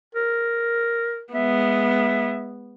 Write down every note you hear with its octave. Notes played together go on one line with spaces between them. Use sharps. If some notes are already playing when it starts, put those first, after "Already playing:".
A#4
G#3 B3 E5